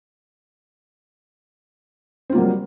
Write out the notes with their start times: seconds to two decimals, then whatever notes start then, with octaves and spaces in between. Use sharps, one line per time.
2.30 C4
2.32 F4
2.35 A#3
2.38 F#3
2.40 G3